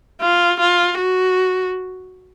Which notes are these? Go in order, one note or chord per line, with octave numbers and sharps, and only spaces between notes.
F4
F4
F#4